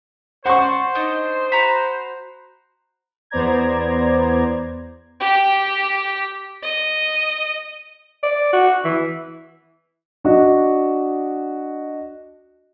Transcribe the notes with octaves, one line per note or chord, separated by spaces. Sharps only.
F#4 C5 D5 F#5 C#6
D4 D#4 D#5
F#4 A#5 B5
E2 B3 C5 D5 A#5 G#6
G4 G5
D#5
D5
F#4
E3
D4 F#4 D#5